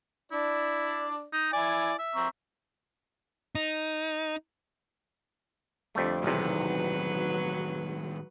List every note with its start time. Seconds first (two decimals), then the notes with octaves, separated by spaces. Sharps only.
0.32 D4 E4 D5
1.33 D#4
1.53 E4 D5 G#5
1.99 E5
2.15 C4 A#5 C#6
3.55 D#4
5.95 F2 D3 G3 A3
6.24 B1 E2 A2 C3 D#3 F#3 B4